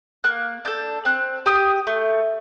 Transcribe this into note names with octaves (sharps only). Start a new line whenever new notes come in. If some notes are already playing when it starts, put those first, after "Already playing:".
A#3 F#6
D4 A4 G6
C4 F#6
G4 D#6
A3